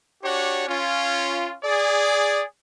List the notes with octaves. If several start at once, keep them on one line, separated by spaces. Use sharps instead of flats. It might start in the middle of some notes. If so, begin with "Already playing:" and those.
D4 F#4 G4 C#5
C#4 F4
G#4 D5